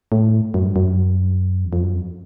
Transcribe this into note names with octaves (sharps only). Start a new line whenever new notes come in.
A2
F#2
G2
F#2
E2
F2
F#2
F2